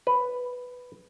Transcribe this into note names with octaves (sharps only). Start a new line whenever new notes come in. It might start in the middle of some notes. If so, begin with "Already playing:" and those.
B4